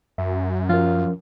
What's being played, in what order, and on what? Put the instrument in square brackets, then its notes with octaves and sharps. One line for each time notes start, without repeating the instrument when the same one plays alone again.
[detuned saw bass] F#2 [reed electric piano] E5
[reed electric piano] F3 C#4 A#4 [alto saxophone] F4